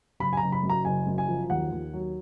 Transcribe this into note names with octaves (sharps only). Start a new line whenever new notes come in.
F#1 B5
G#5
F#1 A#5
B5
F#2
A#5
F#1 G#5
F#2
G#5
F3
D#2 F#5
D#2
F#3